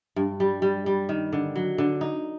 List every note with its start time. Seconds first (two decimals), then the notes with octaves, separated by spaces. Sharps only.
0.16 G2
0.40 G3
0.62 G3
0.86 G3
1.09 D#3
1.33 D3
1.56 F#3
1.78 D3
2.01 D#4